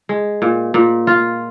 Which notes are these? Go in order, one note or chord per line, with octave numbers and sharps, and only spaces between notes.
G#3
A#2
A#2
F4